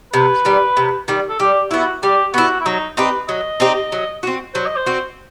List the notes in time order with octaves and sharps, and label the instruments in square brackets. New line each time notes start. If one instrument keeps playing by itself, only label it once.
[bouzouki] C3 [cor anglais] B4
[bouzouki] D#3 G3
C3
D#3 G3
[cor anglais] A4
[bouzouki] G3 [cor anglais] G4
[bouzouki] B3 E4 [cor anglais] F#4
[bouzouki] G3 [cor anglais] G4
[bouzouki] B3 E4 [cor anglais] F#4
[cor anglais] E4
[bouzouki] F#3 [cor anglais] D#4
[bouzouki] C4 D#4 G4 [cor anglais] B4
[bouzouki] F#3 [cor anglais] D#5
[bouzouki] C4 D#4 G4
F#3
C4 F#4
[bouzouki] F#3 [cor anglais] C5
[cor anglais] D#5
C5
[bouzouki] C4 F#4